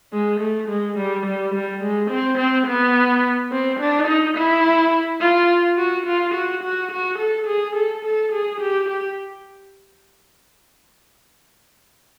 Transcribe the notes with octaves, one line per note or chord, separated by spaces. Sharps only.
G#3
A3
G#3
G3
G3
G3
G#3
C4
C4
B3
C4
D4
D#4
E4
F4
F#4
F4
F#4
F#4
F#4
A4
G#4
A4
A4
G#4
G4
G4